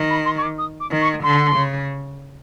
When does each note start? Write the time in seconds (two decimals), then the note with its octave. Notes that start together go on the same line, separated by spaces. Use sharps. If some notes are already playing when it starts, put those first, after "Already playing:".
Already playing: D#3
0.10 B5
0.25 C6
0.38 C#6
0.42 D6
0.58 D#6
0.80 D6
0.91 D#3
1.02 C#6
1.23 D3 C6
1.56 C#3